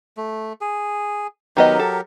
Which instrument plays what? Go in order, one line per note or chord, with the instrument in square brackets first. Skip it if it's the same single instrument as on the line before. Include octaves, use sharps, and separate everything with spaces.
[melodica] A3
G#4
[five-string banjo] D#3 B3 D#5 [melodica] F#3 G4 A#4
[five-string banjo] A4